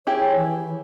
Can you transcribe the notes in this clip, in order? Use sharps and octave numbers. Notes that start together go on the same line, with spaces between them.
E4 G4 G#4 C#5
E3